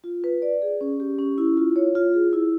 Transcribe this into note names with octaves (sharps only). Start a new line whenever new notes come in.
F4
B4
D5
G#4
C#4
G4
C#4
E4
F4
C#5
F4
G#4
E4